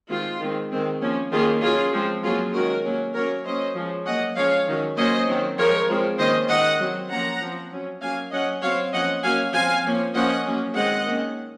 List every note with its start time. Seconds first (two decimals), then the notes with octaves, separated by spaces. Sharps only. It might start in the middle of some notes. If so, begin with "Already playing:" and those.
0.10 D#3 G#3 C4 F4
0.40 D#3 G#3 C4
0.71 D#3 G#3 C4
1.01 F3 A#3 C#4
1.32 D#3 A#3 C#4 F4 G#4
1.62 F#3 C#4 F4 G#4
1.92 F3 G#3 C4
2.23 F#3 A#3 C#4 F4 G#4
2.53 D#3 G#3 C#4 F#4 A#4
2.84 F#3 A#3 C#4
3.14 F#3 A#3 C#4 A#4 C#5
3.45 F#3 A#3 C#4 C5 D#5
3.75 F3 G#3 C#4
4.05 F#3 A#3 C#4 D#5 F#5
4.36 F3 G#3 C#4 C#5 F5
4.67 D#3 F#3 C#4
4.97 F#3 A#3 C#4 C5 D#5
5.27 D#3 F#3 C4
5.58 F3 G#3 C4 A#4 C#5
5.88 F3 G#3 C4
6.18 D#3 A#3 C#4 C5 D#5
6.49 D#3 G#3 C4 D#5 F#5
6.80 F#3 C4
7.10 F3 A#3 C#4 F#5 A#5
7.41 F3 C4
7.71 F#3 C#4
8.01 F#3 A#3 C#4 F5 G#5
8.31 F#3 C#4 D#5 F#5
8.62 F#3 C4 C#5 F5
8.92 F3 A#3 C#4 D#5 F#5
9.23 F#3 A#3 C#4 F5 G#5
9.53 F3 C4 F5 G#5
9.84 F3 A#3 C#4
10.14 F3 A#3 C#4 D#5 F#5
10.45 F#3 A#3 C#4
10.75 D#3 G#3 C4 D#5 F#5
11.05 D#3 A#3 C#4